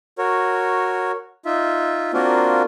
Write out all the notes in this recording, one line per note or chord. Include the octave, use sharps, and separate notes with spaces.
F#4 A#4 C#5
D#4 F4 E5
A#3 C4 D4 F4 F#4 A#4